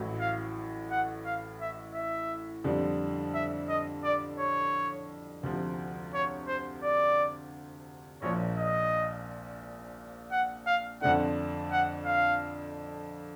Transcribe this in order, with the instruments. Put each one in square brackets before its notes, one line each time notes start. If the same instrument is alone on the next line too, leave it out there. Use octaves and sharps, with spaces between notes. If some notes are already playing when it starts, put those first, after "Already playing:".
Already playing: [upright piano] A1 A2 F#3
[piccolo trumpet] F5
F#5
F5
E5
E5
[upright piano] F2 D3 G3
[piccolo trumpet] E5
D#5
D5
C#5
[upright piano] D2 C3 F3
[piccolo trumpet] C#5
C5
D5
[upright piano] A#1 A#2 F3 [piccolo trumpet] C#5
[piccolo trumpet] D#5
F#5
F5
[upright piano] F2 D3 F3 A3 D4 [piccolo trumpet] F#5
[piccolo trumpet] F#5
F5